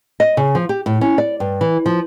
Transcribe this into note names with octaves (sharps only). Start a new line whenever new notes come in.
D#5
C#3
F3
G4
A2
C#4
D5
G2
E3
F3